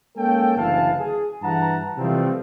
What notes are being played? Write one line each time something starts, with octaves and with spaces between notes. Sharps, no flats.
G#3 A#3 C#4 A4 G5
F#1 D2 E3 F5 A5
G#4
G2 E3 F#5 A5 A#5
C3 E3 F3 G3 A3 C4